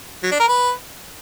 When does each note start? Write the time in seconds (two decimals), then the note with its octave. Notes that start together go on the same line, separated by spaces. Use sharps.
0.23 F#3
0.31 D4
0.40 A#4
0.48 B4